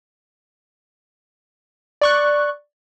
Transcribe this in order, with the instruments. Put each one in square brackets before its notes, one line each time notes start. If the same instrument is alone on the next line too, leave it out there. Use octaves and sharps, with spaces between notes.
[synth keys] D5 C#6 F#6